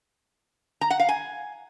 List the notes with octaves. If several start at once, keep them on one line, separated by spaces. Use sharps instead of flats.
A#5
F#5
F5
G#5